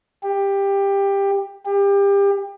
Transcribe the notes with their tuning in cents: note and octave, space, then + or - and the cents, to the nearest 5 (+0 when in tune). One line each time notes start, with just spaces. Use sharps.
G4 +15
G4 +30